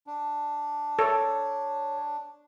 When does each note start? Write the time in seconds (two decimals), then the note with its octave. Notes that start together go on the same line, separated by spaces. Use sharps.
0.07 D4
0.99 A4 C#5